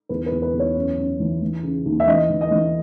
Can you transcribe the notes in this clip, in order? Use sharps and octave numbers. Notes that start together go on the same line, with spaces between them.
E2 B4
B4
E2
B4
E2
C#5
F#2
F#2
E3
E3
C#3
D#2
E5
E3 D#5
E3
D#5
E3